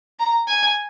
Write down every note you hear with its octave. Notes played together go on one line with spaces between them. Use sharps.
A#5
G#5